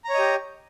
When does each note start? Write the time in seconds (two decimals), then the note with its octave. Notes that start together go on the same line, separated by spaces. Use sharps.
0.05 A#5
0.09 C#5
0.14 D#5
0.19 G4